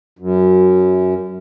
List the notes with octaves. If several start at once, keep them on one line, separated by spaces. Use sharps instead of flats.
F#2